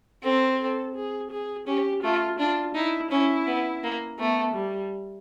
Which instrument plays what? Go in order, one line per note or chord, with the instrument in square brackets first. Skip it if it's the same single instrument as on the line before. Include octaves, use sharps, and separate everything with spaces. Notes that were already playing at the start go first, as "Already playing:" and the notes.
[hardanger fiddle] C4 [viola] A4
[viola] A4
G#4
G#4
[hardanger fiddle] C#4 [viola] G4
[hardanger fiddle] A3 [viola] F4
[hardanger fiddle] D4 [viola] F4
[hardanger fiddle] D#4 [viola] E4
[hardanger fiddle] C#4 [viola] E4
[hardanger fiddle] B3
A#3
[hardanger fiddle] A3 [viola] B3
[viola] G3